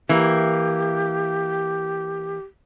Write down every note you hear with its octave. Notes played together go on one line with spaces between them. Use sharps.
E3 A#3 G4